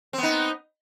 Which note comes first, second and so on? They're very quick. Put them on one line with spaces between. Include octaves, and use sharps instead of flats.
C4 B3 D#4